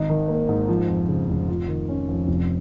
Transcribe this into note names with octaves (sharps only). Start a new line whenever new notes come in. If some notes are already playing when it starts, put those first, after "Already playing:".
Already playing: G#1 D#4
D#3
A#3
G#2
F3
F2
C#3
F1
F4
D#3
C#4
F2
F1